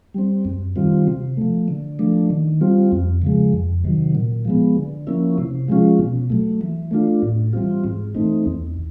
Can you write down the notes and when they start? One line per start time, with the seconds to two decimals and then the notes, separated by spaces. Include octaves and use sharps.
0.14 G3 C4
0.45 F#2
0.76 D#3 G3 C4 F4
1.07 C3
1.37 F3 A3
1.68 D3
1.99 F3 A3 D4
2.30 D#3
2.61 G3 C4 F4
2.92 F2
3.22 C#3 F3 G#3
3.53 F2
3.84 C3 D#3 F#3
4.15 A#2
4.45 F3 G#3 B3
4.76 D3
5.07 F3 A#3 C#4 E4
5.38 C3
5.68 F3 G#3 C#4 F4
5.99 B2
6.30 F#3 A3
6.61 E3
6.91 A3 D4 F4
7.22 A2
7.53 E3 G3 C4 F4
7.84 G#2
8.15 E3 A3 C4 D#4
8.46 E2